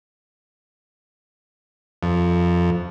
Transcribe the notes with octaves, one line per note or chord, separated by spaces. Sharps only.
F2